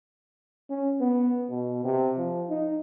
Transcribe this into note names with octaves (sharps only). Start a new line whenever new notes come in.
C#4
B3
B2
C3
F3
D#4